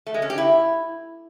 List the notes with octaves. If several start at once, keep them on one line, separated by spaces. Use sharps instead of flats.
A3
G#3
C#4
G4
E4